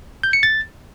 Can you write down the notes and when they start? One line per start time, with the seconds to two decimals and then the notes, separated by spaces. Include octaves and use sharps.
0.23 G6
0.33 C#7
0.43 A6